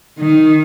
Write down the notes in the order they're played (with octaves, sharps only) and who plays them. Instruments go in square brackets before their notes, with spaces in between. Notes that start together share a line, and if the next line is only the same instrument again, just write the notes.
[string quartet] D#3